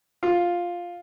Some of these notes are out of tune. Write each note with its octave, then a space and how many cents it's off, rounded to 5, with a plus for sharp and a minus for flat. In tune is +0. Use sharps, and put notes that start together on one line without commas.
F4 +5